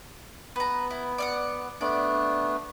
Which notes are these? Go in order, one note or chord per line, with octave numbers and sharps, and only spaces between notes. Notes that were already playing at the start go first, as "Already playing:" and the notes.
B3 B4 A#5
E4
D5 F5 F#5
A3 B3 D4 D5